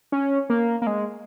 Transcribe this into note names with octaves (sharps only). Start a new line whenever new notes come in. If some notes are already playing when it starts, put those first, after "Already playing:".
C#4
A#3
A#3
G#3